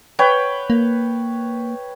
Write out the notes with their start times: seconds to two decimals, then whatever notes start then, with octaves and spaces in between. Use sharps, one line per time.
0.19 B4 C#5 G5
0.70 A#3